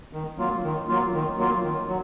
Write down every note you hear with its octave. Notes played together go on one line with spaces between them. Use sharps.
D#3
F#3 A#3 F4
D#3
F#3 A#3 F4
D#3
F#3 A#3 F4
D#3
F#3